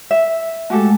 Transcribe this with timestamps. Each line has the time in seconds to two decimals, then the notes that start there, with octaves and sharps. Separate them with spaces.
0.11 E5
0.70 G#3 A3 F#4 G4 A4